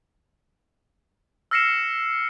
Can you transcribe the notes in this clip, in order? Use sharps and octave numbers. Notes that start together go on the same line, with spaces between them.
E6 F6 A#6 C7 C#7 E7